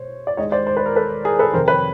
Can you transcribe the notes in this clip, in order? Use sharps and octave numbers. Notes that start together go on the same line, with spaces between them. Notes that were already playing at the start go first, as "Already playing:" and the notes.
Already playing: B2 C5 C#5
D5
D#2 D#3 G#3 C#5 D#5
C5 D5
C5
B4
A#4
A4 B4
G#4 A#4
A4 B4
F2 C3 D#3 A#4 C5
B4 C#5